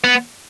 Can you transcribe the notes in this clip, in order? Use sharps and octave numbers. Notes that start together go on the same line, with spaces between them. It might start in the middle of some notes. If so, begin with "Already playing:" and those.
B3